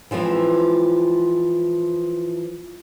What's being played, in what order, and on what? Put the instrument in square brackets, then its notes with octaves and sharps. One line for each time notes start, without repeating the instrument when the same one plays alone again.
[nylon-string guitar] E3 F3 G#3 C4